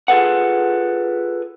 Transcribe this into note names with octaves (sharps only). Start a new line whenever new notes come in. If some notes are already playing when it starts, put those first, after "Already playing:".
F4 G#4 A4 B4 F#5